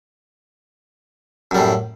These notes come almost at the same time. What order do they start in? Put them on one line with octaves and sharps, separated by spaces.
F#2 G3 A2